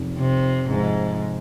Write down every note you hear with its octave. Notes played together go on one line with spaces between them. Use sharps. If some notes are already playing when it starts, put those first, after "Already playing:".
Already playing: F1 F2 D#3
C3
F2 G#2 C3 F3